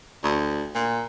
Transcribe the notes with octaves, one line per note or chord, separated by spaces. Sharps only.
D2
A#2